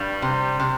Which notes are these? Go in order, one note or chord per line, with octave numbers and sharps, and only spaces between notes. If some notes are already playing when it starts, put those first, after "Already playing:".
Already playing: G2 G3
C3
C3